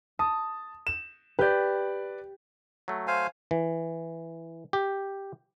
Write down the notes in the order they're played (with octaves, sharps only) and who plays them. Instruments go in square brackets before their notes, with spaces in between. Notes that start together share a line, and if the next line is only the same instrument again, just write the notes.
[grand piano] A5 [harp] D#6
[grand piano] E7
[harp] G4 G6 [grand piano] B4 D5
[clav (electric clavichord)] F#3 A3
[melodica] C5 F5 G#5
[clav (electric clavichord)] E3
G4